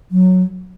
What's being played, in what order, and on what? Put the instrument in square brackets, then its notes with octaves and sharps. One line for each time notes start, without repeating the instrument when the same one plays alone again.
[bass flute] F#3